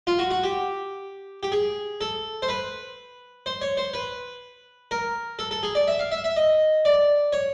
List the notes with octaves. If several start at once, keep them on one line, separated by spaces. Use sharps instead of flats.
F4
F#4
F#4
G4
G4
G#4
A4
C5
B4
C5
C#5
C5
B4
A#4
A4
A4
G#4
D5
E5
F5
E5
E5
D#5
D5
C#5